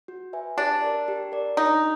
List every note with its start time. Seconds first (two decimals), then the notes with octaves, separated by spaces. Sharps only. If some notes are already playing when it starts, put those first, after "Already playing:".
0.08 F#4
0.33 B4 E5 G#5
0.58 D4 G4
0.82 A#4 D5
1.08 G4
1.32 A#4 D5
1.57 D4 D#4